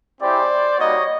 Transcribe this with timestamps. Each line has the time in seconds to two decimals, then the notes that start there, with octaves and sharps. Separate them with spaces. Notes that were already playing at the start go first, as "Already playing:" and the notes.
0.21 G#3 C4 E4 G4 C5 D5
0.78 G3 A#3 D#4 F#4 C#5 D#5